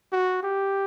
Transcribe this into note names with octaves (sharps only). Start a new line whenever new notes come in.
F#4
G4